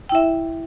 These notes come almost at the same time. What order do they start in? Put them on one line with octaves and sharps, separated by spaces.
G5 E4 E5